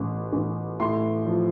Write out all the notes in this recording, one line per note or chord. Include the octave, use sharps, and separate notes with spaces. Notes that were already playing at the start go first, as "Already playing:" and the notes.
Already playing: A1
A1
A2 C6
F3